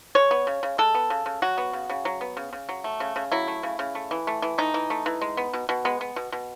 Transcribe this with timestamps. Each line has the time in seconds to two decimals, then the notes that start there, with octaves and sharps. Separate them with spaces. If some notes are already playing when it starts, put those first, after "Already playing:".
0.15 G#3 C#5
0.31 B3
0.47 C#3
0.63 C#3
0.78 G#3 A4
0.95 B3
1.10 C#3
1.26 C#3
1.42 F#3 F#4
1.58 B3
1.73 C#3
1.90 C#3
2.05 F#3
2.21 B3
2.37 C#3
2.53 C#3
2.69 F#3
2.84 A3
3.00 C#3
3.16 C#3
3.32 F#3 E4
3.48 A3
3.63 C#3
3.79 C#3
3.95 A3
4.11 E3
4.27 A3
4.42 E3
4.58 A3 D#4
4.74 E3
4.90 A3
5.06 E3
5.21 G#3
5.37 B3
5.53 B2
5.69 B2
5.85 G#3 B3
6.01 B3
6.16 B2
6.32 B2